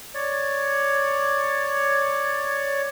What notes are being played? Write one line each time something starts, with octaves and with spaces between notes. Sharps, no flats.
C#5 D5